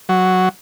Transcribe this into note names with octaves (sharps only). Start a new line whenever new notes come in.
F#3